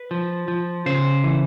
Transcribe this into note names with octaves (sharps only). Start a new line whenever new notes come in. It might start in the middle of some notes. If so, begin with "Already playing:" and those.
Already playing: B4
F3
F3
C#3 C5
E3